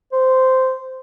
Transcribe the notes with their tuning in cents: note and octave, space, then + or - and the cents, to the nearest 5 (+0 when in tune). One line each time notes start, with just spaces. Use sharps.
C5 -10